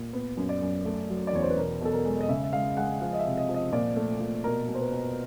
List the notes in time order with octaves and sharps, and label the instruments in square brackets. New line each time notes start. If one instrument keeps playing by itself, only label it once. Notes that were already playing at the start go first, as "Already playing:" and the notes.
Already playing: [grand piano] A#2
B3
F#2
D5
F#2
A3
F#3
D5
E2 C#5
C5
B4
B2 A#4
B2 A4
A#4
G#3
D#5
C#3 E5
E5
G#3 F5
G#3 F#5
F3 F5
D#5
E5
C3
D#5
F3
D#5
A#2 D5
A3
A#2
B2 A#4
B2
C5
B4
B2